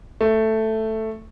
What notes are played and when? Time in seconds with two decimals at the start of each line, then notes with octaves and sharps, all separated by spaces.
0.21 A3